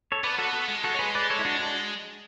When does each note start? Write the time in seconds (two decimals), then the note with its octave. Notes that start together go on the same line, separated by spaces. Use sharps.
0.12 A4 C#5
0.24 B3 B4 D5
0.38 F#4 A4
0.53 F#4 A4
0.68 G#3
0.84 F#4 A4
0.95 C#5
0.99 G#4 B4
1.15 B4 D5
1.30 A4 C#5
1.39 E4
1.45 D4 F#4
1.59 D4 F#4